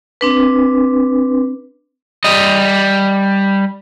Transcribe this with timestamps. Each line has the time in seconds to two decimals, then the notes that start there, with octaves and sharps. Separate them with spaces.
0.21 C4 D4 B4
2.24 G3 D#5